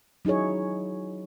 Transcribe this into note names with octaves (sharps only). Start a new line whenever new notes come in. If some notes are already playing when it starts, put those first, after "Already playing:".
F#3 D#4 E4 G#4 C#5